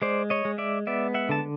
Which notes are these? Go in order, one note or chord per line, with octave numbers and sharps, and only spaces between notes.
G#3 C5 D5
C#5 D#5
G#3
D5 E5
B3 D5 E5
E5 F#5
D3 A5